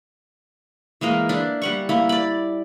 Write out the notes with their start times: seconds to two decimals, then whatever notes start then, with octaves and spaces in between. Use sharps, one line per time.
1.01 E3 G#3 A#3 A#4
1.29 D4 E4
1.62 G3 F#5 C#6
1.89 A#3 E4
2.09 D5 B5